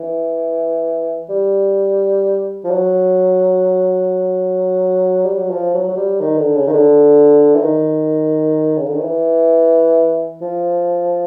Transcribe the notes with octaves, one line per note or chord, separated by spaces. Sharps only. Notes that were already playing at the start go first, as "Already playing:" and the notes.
Already playing: E3
G3
F3
F#3
G3
F#3
F3
F#3
F#3
G3
D#3
D3
C#3
D#3
D3
E3
D#3
C#3
D3
D#3
E3
F3